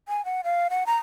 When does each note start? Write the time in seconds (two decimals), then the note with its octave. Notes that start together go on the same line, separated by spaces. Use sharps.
0.08 G#5
0.25 F#5
0.44 F5
0.70 F#5
0.86 A#5